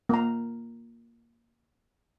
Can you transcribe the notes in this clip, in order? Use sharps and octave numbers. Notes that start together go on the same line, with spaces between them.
A#3 A#5